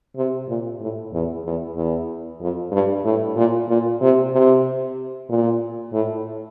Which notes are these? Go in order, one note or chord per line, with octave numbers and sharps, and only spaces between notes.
C3
A#2
A2
E2
E2
E2
F2
G2
A2
A#2
A#2
C3
C3
A#2
A2